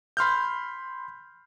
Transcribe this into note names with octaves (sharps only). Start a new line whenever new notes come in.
B5 C6 F6 G6